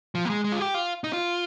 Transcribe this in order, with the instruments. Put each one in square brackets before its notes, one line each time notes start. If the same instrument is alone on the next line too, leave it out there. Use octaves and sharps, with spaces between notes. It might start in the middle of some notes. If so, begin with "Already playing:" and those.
[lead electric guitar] F3
A#3
G#3
G#3
F4
G4
F4
D#4
F4